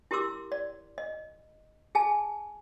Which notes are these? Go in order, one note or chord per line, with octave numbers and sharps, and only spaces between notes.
E4 G4 A#4 C6 D6 E6
D5
D#5
G#4 G#5 A5